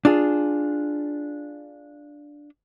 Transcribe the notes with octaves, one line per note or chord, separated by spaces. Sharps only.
D4 F4 G#4